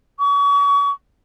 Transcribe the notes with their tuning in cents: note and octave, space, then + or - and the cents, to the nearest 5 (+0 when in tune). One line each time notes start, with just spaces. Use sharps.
C#6 +35